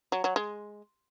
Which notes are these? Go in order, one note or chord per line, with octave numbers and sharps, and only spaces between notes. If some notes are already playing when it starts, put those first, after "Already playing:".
F#3
F#3
G#3